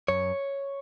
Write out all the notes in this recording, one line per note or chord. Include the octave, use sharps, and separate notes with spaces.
F#2 C#5